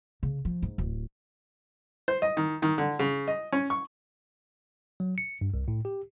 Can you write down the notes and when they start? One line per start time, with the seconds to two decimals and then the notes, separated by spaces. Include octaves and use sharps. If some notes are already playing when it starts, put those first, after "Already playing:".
0.23 C#3
0.45 F3
0.62 G#2
0.78 D1
2.08 C5
2.22 D#5
2.37 D#3
2.62 D#3
2.78 D3
2.99 C#3
3.28 D#5
3.52 C#4
3.70 C#6
5.00 F#3
5.18 C#7
5.41 G2
5.54 C2
5.68 A2
5.85 G4